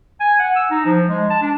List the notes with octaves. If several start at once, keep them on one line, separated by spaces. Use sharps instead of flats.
G#5
F#5
E6
D#4
F3
G#3
A5
D4